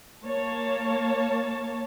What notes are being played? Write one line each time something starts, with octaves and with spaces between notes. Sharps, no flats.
A#3 C#5 A5